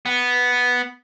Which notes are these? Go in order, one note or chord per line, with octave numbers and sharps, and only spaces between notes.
B3